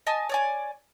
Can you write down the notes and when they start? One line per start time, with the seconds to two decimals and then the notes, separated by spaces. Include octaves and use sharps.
0.07 D#5 G#5 A5
0.29 C#5 D5 G#5